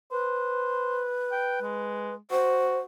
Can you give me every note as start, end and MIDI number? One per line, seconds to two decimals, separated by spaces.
0.11 2.15 71
0.11 1.04 72
1.32 1.61 79
1.62 2.16 56
2.31 2.85 66
2.31 2.79 72